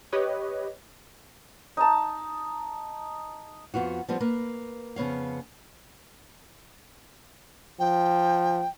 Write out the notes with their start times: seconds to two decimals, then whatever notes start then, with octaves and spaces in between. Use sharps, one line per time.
0.12 G4 B4 C#5 D#5
1.77 D#4 A5
3.74 F2 B3 F4 F#4
4.08 F3 G3 B3 C4
4.20 A#3 A#4 B4
4.96 F2 C#3 B3 C#5 F5
7.80 F3 G5